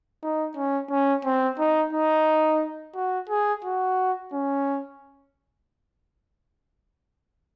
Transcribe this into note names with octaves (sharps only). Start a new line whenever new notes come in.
D#4
C#4
C#4
C4
D#4
D#4
F#4
G#4
F#4
C#4